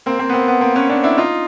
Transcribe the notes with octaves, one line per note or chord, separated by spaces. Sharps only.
A#3 C4
A#3 C4
B3
A#3 C4
B3
A#3 C4
B3 C#4
C4 D4
D4 E4
D#4 F4